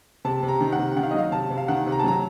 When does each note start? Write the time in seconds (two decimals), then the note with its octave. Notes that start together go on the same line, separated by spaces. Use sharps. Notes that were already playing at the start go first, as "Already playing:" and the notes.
0.25 C3 A5
0.43 C3
0.48 A#5
0.61 D#3
0.72 F#5
0.79 C3
0.96 D#3 F#5
1.03 F5
1.11 D#5
1.14 F#3 F5
1.32 C3 A5
1.50 C3
1.58 F5
1.68 D#3 F#5
1.86 C3
1.92 A#5
2.00 A5
2.04 F#3 A#5